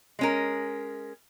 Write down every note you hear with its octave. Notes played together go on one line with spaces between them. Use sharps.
G#3 C#4 A#4